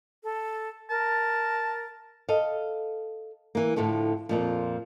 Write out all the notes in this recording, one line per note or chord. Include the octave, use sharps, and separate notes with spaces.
A4
A#4 A5
A4 D#5 F5
E3 A#3
A2 D3 F3 A3
F2 A#2 F3